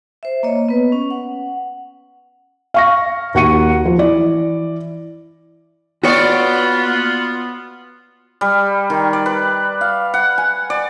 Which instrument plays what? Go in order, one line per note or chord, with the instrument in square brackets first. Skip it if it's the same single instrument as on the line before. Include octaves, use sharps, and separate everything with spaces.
[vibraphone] C5 E5
A#3 C#5 D#5
B3 B4
C#4
F#5
[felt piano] F5 C#6 A#6
D#2 F#4 F#5 C#6 C#7 D#7
F3
E3 D5
[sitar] A#3 D5 [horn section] B3 [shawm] F4 [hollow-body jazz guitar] F#4 C#5
[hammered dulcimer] G3
D#3
D5
B4
F5
F#5
G#5
D5